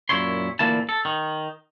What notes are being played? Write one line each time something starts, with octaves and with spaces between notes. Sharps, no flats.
F#2 A#2 E4 C#5 C6
D2 A#2 E3 A#3 E4 A5
A4
D#3